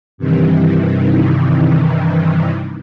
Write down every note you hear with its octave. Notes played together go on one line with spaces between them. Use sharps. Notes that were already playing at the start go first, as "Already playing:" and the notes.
G2 C3 D#3 E3